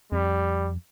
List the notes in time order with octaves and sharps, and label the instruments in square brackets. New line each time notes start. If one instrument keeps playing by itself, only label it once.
[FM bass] F2 [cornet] G3